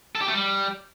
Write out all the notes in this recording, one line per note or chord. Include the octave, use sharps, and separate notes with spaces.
A4
G4
A3
G3